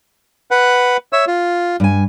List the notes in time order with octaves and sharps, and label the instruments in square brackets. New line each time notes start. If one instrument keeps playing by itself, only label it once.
[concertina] B4 F#5
C#5 E5 E6
F4
[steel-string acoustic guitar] G2 G#5